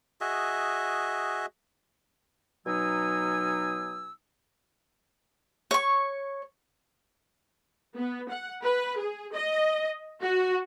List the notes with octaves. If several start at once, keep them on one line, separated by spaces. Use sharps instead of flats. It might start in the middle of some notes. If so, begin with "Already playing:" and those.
F#4 G#4 D#5 E5
B2 F#3 D#4 G#5 D#6 E6
C#5 C#6
B3
F#5
B4
G#4
D#5
F#4